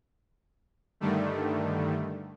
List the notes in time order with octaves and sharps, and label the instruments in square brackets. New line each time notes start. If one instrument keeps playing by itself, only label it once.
[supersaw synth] G2 D3 D#3 G3 A3